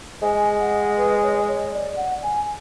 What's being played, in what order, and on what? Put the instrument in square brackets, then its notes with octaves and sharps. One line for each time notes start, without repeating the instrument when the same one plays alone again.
[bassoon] G#3 [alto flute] G#5
[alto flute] F#5
B4
C#5
C#5
D5
F#5
G#5